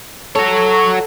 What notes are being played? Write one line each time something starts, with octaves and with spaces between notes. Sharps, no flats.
F#4 A4 C#5